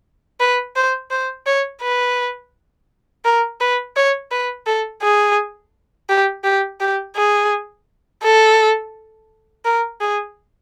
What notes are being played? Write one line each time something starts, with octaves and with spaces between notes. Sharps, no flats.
B4
C5
C5
C#5
B4
A#4
B4
C#5
B4
A4
G#4
G4
G4
G4
G#4
A4
A#4
G#4